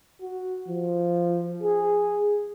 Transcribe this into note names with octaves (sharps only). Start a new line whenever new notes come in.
F#4
F3
G#4